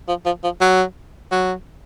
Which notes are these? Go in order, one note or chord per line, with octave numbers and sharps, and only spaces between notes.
F3
F3
F3
F#3
F#3